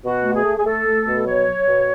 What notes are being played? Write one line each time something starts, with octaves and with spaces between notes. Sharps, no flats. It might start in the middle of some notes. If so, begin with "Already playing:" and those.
B2 F#4
A3
G#4
A3
G#4
A3 A4
A3
B2
F#3 C#5
F#3
B2